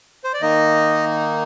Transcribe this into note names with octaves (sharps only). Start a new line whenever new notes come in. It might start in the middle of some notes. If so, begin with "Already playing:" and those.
C5
D5
D#3 A#3 D#4 D#5